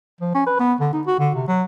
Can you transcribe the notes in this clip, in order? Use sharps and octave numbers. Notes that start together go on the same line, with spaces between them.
F3
C#4
B4
B3
D3
D#4
F#4
D3
C3
F#3